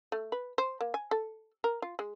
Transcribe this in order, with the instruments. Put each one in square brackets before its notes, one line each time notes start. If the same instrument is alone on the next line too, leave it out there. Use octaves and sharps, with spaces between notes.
[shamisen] A3
B4
C5
A#3
G#5
A4
A#4
F4
G#3